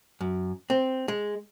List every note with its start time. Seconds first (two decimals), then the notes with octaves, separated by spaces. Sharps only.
0.21 F#2
0.70 C4
1.08 G#3